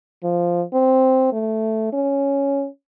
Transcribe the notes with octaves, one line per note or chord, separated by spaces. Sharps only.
F3
C4
A3
C#4